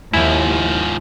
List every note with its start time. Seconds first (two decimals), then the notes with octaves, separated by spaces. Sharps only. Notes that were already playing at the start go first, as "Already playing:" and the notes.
0.13 D#2 G#2 F3 E4